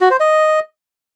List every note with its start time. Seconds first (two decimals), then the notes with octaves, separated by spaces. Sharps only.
0.01 F#4
0.10 C5
0.20 D#5